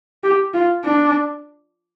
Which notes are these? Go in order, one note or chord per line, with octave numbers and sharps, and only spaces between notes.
G4
F4
D4